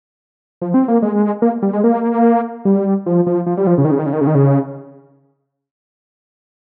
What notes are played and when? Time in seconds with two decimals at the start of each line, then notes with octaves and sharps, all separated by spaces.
0.62 F3
0.74 C4
0.88 A#3
1.02 G#3
1.42 A#3
1.62 G3
1.73 G#3
1.84 A#3
2.65 G3
3.06 F3
3.26 F3
3.46 F3
3.57 G3
3.67 F3
3.78 C#3
3.85 D#3
3.91 C#3
3.99 D#3
4.06 C#3
4.13 D#3
4.21 C#3
4.27 D#3
4.35 C#3